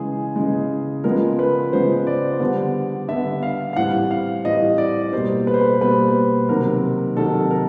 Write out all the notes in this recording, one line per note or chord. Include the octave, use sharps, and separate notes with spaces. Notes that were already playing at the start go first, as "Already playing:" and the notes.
Already playing: C#3 E3 G#3 G#4
C#3 E3 G#3
C#3 F3 G#3 B3 A#4
B4
C#3 F3 G#3 B3 C5
D5
D3 G3 B3
D3 G3 B3 E5
F5
F5
A2 E3 G3 C4 F#5
F5
A2 E3 G3 C4 D#5
D5
B2 G3 A#3 C5
B4
C5
B4
B2 G3 A#3 B4
C3 D#3 F#3 A#4
C3 D#3 F#3 A4
A#4